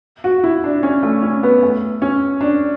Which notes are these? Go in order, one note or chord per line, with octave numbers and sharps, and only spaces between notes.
F#4
E4
D4
C#4
A3
C#4
B3
A3
C#4
D4